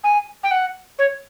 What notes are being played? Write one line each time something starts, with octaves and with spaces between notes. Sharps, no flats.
G#5
G5
F#5
C#5